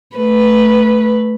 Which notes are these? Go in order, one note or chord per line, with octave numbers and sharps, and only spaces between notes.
A3 B4